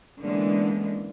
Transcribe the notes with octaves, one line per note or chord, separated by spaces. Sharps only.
D3 E3 G#3 A#3 B3 C#4